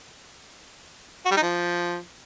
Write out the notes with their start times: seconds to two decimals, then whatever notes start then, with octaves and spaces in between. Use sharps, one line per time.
1.26 F#4
1.31 G3
1.37 D#4
1.42 F3